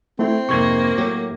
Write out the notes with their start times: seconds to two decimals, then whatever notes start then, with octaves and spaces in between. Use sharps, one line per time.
0.19 A3 C4 E4
0.49 F2 G#2 C3 A#3 C#6 G#6
0.97 A2 F#3 G4